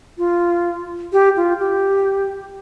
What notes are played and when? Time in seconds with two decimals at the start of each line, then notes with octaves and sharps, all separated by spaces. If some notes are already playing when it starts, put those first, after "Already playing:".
0.18 F4
1.13 G4
1.37 F4
1.60 G4